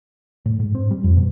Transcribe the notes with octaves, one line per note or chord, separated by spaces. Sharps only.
A2
G#2
C4
G3
F2
B2